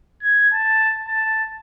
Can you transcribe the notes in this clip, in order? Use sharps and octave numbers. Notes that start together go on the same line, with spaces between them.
G#6
A5
A5